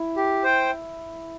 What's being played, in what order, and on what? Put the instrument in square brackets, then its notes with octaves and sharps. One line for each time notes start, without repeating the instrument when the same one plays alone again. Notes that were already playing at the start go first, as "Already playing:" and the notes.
Already playing: [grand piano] E4
[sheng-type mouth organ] G4
C5 G5